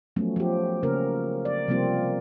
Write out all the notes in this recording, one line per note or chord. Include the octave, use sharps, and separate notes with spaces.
F3 F#3 A3 B3 C#4
F3 G4
C#3 A#3 C#4 A#4
D5
C3 F3 G3 A#3 C4 F4